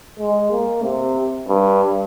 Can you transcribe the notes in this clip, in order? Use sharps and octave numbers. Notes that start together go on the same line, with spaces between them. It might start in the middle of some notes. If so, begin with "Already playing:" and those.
G#3
A#3
C3
G2